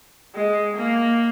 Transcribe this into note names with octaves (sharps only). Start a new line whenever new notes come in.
G#3
A#3